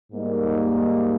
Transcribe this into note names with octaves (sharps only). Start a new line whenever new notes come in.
G#2 G3 A#3 D#4